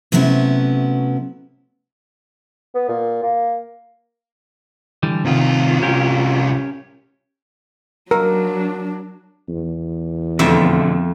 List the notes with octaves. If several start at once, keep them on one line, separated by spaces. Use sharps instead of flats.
C3 F#3 A3 B3 C#4 E4
B3
A#2
A#3
D3 E3 G3
C2 C3 D#3 F4
C#4 G4 A#4
F#3 D4 A#4
E2
F2 B2 D3 A3 E5